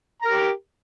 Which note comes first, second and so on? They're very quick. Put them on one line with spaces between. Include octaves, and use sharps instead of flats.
A#5 A#4 G4